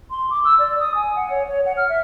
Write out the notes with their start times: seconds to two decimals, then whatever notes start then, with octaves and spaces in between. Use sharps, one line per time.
0.11 C6
0.30 D6
0.45 E6
0.59 D5
0.80 D#6
0.95 G#5
1.16 F#5
1.30 C#5
1.48 C#5
1.66 F#5
1.77 F6
1.89 E5